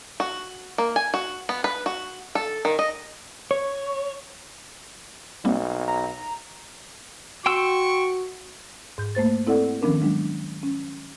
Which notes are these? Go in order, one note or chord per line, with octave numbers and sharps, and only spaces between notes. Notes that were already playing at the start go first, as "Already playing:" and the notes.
F#4
A#3
G#5
F#4
B3
B4
F#4
A4
D#3
D#5
C#5
B1 G3 A#3 C4
A#5
F#4 G5 C6 C#6 E6
G#2 G6
A3 A#3 C5 A6
C4 E4 A4 D5 F#5
D#3 F3 B3 C#4 D4 A#4
F#3 G#3 D4
C#4